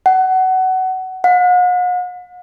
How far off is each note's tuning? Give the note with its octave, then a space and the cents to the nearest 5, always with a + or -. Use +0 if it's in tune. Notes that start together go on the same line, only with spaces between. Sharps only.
F#5 +20
F#5 -45